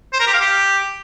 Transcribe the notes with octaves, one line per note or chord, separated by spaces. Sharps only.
C5
A#4
G4
F5
G4